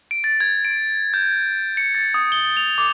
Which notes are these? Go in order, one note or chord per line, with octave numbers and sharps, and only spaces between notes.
D7
A6
G#6
D7
G6
C#7
A6
D#6
G7
F7
D6